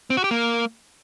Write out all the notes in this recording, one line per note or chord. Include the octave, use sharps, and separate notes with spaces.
C4
F#4
G4
A#3